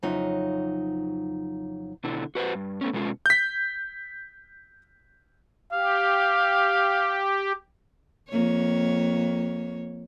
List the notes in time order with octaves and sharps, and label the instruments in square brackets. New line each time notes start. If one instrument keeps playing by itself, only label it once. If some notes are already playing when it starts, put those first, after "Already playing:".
[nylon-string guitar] F2 C#3 F#3 D#4 F4 E5
[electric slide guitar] B2 D3 E4
F#4 B4 C5 F#5
G2
A3 B3 C#4
B2 G#3 C#4 F4
[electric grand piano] G6 B6
[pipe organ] G4 [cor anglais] F5
[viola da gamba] F2 A#3 C#5